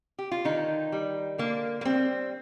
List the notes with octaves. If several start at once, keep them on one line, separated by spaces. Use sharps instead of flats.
G4
F4
D3 D#3 D#4
G3
D3 A#3
A#3
G3 C4